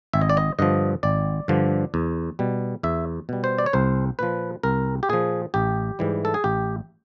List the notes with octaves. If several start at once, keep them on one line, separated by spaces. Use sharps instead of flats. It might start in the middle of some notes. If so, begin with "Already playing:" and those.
G#1 E5
D#5
D5
D#5
G2 D3 F3 D#5
G#1 D5
G2 D3 F3
E2
B2 G3
E2 E5
B2 G3
C5
D5
C#5
C2 C5
A#2 F3 B4
C2 A#4
G4
A#2 F3 G#4
A1 G4
G#2 E3 G3
A4
G#4
A1 G4